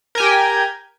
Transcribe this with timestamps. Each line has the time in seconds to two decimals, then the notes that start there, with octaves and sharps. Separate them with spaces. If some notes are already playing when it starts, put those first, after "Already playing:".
0.15 A#4
0.18 G#5
0.20 G4
0.23 G5